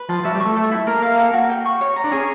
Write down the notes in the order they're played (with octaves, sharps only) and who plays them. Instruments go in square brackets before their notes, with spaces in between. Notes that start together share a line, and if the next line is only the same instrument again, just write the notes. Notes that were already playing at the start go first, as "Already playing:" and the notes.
Already playing: [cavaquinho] B4
[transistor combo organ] F3 [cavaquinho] A5
[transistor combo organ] F#3 [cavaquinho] E5
[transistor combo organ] G3
[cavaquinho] C#6
[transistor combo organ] A3
[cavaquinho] A4
E4
[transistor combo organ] A#3 [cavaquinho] A#4
[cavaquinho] F5
A4
F#4
G5
C#6
C#5
A#5
[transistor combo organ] D4
[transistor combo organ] C#4 [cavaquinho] G#4